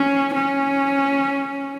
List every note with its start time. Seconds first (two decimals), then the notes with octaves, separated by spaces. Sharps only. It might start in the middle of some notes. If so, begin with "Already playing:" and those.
Already playing: C#4
0.35 C#4